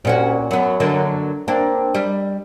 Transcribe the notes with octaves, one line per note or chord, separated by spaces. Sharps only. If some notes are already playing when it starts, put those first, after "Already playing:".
C2 A#2 C#4 F#4
F#2 F#3 B3
D3 F#3 A#3
A#3 C4 D4
G3